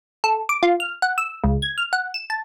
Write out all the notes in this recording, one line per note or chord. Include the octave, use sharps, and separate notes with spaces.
A4
D6
F4
F6
F#5
E6
C#2
G#6
F6
F#5
E7
A5